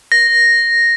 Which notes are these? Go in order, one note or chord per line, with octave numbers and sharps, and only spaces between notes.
A#6